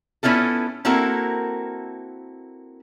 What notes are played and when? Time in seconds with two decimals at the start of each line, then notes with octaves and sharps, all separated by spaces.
0.23 B3 C#4 E4 F4 A4
0.85 A#3 C4 E4 F#4 A4 A#4